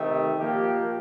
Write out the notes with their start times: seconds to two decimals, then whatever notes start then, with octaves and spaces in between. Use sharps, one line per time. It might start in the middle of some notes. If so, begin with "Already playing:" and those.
Already playing: C3 D#3 A3
0.37 A#2 F3 A#3 G4